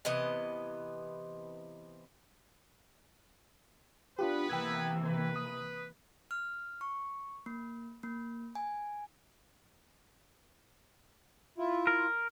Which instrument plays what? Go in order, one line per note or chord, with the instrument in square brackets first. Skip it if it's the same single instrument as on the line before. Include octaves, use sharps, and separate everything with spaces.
[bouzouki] C3 E3 B3 D#5
[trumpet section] B3 B4 [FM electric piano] D4 F4 G4
[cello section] C3 E3 A#3 [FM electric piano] G5 E6 G#6
[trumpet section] B4
[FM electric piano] D#6
[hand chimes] F6
C#6
A#3
A#3
G#5
[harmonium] E4 F4
[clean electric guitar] A#4